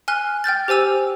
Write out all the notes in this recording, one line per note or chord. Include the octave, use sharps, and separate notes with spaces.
G#5 F6 F#6 G7
G5 F6 G6 A6
G4 C5 G#5 E6 F7